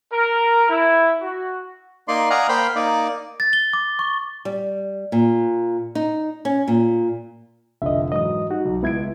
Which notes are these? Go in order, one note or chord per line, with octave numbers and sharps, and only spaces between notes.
A#4
E4
F#4
A#3 D#4 D5 C6
D5 D#5 F5 F#5 G#5 A#5
A#3 C5 F5 G5 B5
A#3 D#4 D5
A6
G7
D6
C#6
G3
A#2
D#4
C#4
A#2
F1 D3 F4 D#5 E5
G#2 E3 F#3 D#5 D#6
G3 D#4 F#4
B1
C#2 B3 E4 E5 G#6 D7